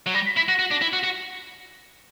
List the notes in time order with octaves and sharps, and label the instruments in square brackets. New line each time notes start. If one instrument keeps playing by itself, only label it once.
[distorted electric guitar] F#3
[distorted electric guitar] G3 [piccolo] A#6
[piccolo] B6
[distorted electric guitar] E4 [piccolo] B6
[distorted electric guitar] F#4 [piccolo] A#6
[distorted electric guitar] F#4
D4
E4
F#4
F#4